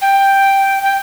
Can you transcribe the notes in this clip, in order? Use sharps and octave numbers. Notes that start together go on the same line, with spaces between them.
G5
G5